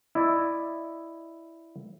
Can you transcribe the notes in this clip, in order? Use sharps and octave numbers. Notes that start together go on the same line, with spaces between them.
E4 D5 D#5